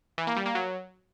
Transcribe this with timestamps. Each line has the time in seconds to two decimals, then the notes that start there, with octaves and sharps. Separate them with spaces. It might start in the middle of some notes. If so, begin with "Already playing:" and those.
0.18 E3
0.27 A#3
0.36 G3
0.46 A#3
0.55 F#3